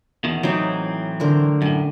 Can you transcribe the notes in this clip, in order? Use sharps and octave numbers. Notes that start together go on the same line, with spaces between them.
E2 B2 D#3
A2 E3 F#3 C4 D#4
D3 A#4 C5
F#2 A2 G#5